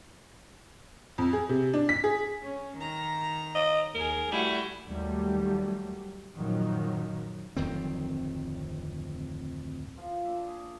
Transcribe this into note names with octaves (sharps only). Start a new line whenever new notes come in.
F2
G#4
C3
D4
B6
G#4
C#4
D#3 A#5
D#5
D#2 G#4 A#4
G3 A3 E4 F#4
D#2 F#3 G3 A3
F#2 A#2 D#3 F3 F#3
D1 F2 D#3 C4
F3 F4
A#2 D4 E5
G#4
G#4